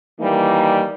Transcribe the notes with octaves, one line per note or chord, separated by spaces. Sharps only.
D#3 E3 G3 A#3 D#4